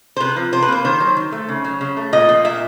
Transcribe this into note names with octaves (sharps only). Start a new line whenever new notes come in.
C5
C3 B4
F3
C3 C5
B4
A#3 C5
D#3 C5
F#3
D#3
A3
C#3
F#3
C#3
A3
A#2 D#5
F3
A#2 E5